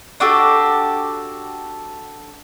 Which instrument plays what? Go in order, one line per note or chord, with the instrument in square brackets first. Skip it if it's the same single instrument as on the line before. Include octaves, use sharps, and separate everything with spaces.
[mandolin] D4 F#4 G4 A4